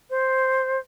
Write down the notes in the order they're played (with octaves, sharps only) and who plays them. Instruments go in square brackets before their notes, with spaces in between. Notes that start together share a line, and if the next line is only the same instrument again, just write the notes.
[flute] C5